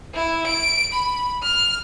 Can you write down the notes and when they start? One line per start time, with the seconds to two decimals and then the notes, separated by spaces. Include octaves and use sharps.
0.14 E4
0.47 D7
0.93 B5
1.43 F6